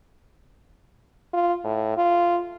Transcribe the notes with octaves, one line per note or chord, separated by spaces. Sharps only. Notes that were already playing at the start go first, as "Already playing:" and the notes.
F4
A2
F4